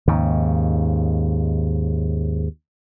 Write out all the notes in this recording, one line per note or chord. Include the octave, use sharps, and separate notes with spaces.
D#2 G#2 C#3